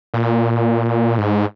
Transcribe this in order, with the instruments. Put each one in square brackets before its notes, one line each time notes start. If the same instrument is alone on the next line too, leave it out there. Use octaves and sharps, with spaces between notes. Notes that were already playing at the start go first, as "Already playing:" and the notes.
[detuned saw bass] A#2
G#2